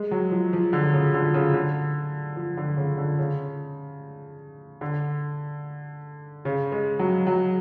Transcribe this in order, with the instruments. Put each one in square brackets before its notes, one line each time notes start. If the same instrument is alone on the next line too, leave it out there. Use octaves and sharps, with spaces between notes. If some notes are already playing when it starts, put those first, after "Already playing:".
Already playing: [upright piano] G#3
F#3
F3
F3
D3
C#3
D3
C#3
D3
F3
D3
C#3
D3
C#3
D3
C#3
G#3
F#3
F#3